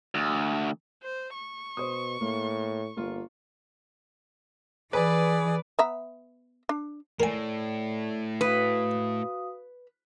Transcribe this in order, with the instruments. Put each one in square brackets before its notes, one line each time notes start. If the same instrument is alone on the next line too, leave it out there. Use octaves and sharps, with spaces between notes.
[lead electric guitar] D2
[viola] C5
C#6
[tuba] B2 [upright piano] C5 D#6
[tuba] A2 [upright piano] A#3
[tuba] G1 [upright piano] A#3 F4
[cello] E3 [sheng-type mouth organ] G#4 [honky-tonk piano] B4 [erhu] D5
[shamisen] B3 E5 A#5
D4
[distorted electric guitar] A2 [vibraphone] A4 D5 [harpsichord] A#4 G#5
[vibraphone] F#4 F5 D#6 [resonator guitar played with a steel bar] B4